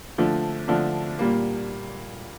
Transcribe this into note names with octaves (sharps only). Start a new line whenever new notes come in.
D3 F3 A3 D4
D3 F3 A3 D4
A#2 G3 A#3